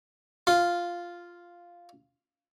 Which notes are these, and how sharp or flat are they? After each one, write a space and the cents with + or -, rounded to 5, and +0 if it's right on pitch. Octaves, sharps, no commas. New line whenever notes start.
F4 +0 C6 -20